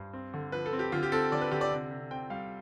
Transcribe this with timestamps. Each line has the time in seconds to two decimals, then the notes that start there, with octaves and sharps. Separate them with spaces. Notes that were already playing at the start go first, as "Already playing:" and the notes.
Already playing: G2 C5
0.13 C4
0.34 D3
0.52 F3 B4
0.66 A4
0.73 C4
0.79 G4
0.92 D3 F4
1.03 G4
1.12 C4 A4
1.32 D3 D5
1.41 B4
1.51 D3 G4
1.61 D5
1.71 C3
1.91 C3
2.11 C4 G5
2.30 G3 F5